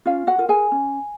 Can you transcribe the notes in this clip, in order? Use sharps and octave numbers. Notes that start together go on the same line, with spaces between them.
C#4 F4 F5
F#4 F#5
F4 A#4
G#4 G#5
C#4